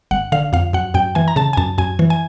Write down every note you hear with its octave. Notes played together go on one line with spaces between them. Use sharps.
G1 F#5
D3 F5
F2 F5
F#2 F#5
F#2 G5
E3 G#5
A#5
C#3 A5
G#5
F#2 A5
F#2 G#5
E3
G#5